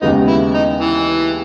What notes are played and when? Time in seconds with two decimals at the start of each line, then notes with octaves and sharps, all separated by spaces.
0.02 D#2 C#3 G#3 B3 D#4
0.28 E4
0.54 D#4
0.81 E3